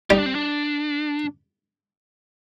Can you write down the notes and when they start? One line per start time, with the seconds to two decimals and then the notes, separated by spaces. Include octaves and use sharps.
0.10 G3 D#4
0.19 D4
0.26 C4
0.35 D4